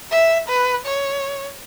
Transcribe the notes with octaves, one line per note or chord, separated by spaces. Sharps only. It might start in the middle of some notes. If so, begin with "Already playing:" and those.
E5
B4
C#5